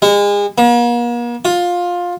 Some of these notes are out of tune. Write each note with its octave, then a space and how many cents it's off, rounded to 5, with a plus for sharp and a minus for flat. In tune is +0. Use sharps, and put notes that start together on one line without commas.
G#3 -35
A#3 +45
F4 +15